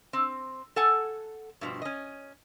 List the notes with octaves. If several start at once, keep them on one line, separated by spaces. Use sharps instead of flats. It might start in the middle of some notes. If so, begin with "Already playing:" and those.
C4
A4 F#5 G#5
G2 B2 F3
C#4 D#5